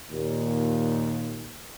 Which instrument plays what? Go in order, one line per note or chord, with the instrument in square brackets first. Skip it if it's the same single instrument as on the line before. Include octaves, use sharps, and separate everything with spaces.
[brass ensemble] D#2 A#2